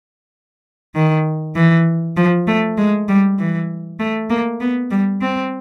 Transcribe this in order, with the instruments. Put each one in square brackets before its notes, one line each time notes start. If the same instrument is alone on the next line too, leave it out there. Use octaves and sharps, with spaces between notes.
[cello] D#3
E3
F3
A3
G#3
G3
E3
A3
A#3
B3
G3
C4